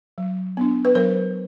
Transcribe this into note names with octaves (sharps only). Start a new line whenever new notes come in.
F#3
B3 D4
B4
F#3 A#4 C5